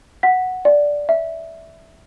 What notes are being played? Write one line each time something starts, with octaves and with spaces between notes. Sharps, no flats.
F#5 B6
D5
E5